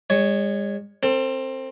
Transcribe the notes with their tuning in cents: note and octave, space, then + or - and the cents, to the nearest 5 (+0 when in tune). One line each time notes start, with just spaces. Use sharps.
G#3 -40 C#5 +0
C4 +15 A4 +45